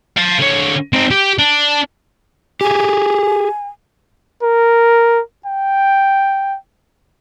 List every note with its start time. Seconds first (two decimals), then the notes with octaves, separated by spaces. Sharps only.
0.17 F5 A5
0.39 D3 C#5
0.93 C4 D#4
1.11 G4
1.39 D4
2.61 G4 G#4 G#5
4.43 A#4
5.46 G5